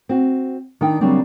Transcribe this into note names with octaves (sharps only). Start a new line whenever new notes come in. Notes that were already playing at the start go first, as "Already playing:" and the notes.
C4 F#4
D#3 D4 D#4 G5
C#3 F#3 G3 A#3 C4 D4